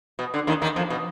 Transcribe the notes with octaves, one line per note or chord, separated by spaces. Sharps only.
B2
D3
D#2 D#3
D#2 D#3
F2 F3
B2